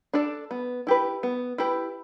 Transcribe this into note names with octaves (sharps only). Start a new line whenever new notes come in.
D4 A4 D5
B3
E4 G4 B4
B3
E4 G4 B4